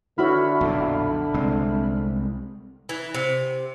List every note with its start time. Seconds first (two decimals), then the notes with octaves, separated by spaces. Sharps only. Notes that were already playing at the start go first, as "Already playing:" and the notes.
0.18 D3 E4 F#4 C#5 E5 B5 F6
0.61 B1 F2 A#2
1.34 C2 G#3 C4
2.89 E3
3.14 C3